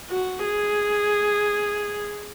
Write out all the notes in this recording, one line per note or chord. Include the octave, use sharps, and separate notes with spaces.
F#4
G#4